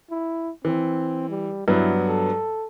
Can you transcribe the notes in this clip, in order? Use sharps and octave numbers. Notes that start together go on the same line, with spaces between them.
E4
E3 C4
G3
G2 F#3 B3 E4
A4